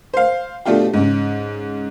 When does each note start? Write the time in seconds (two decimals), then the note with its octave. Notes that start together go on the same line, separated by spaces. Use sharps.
0.14 C5 F5
0.66 B2 A3 D4 F4 G4
0.93 G#2 C#3